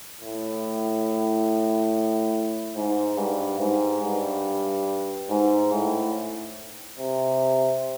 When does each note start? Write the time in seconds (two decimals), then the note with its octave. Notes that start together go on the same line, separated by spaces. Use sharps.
0.20 A2
2.76 G#2
3.17 G2
3.60 G#2
4.03 G2
5.30 G#2
5.73 A2
6.99 C3